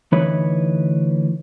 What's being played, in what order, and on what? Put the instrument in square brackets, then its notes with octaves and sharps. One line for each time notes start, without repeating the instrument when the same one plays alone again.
[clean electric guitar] D2 E3 D#4 B4 C#5 B5